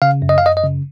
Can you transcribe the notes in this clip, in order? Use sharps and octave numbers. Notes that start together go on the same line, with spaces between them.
C#3 F5
F#2
D#5
F5
F#2 D#5
D#5
C#3